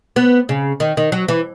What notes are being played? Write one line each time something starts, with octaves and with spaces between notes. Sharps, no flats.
B3
C#3
D#3
D#3
F#3
E3